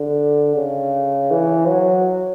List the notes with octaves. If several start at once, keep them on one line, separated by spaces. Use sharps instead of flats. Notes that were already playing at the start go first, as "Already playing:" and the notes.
Already playing: D3
C#3
E3
F#3